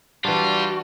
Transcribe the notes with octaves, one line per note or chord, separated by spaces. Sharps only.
E3 G3 D4 F4 F#4